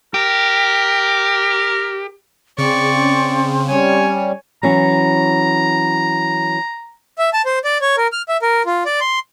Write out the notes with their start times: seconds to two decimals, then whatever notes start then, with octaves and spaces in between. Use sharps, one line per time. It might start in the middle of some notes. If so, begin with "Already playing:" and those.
0.14 G4 A#4
2.58 C#3 C4 D5 C#6
3.68 G3 C#4 C#5 G#5
4.63 E3 F#3 C#4 A#5
7.17 E5
7.33 A5
7.45 C5
7.65 D5
7.81 C#5
7.98 A#4
8.12 F6
8.29 E5
8.42 A#4
8.66 F4
8.86 D5
9.01 C6